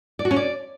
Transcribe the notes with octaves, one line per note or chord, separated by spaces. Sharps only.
D5
F#4
C#4
D5